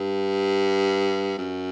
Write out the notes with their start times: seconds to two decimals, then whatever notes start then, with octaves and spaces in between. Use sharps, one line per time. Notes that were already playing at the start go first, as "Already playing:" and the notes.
Already playing: G2
1.38 F#2